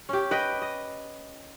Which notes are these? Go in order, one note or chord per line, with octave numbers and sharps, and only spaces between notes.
C#4 G4
B4 D#5 G5
D#5